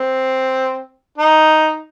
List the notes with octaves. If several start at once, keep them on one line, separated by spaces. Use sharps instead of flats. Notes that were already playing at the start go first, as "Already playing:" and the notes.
Already playing: C4
D#4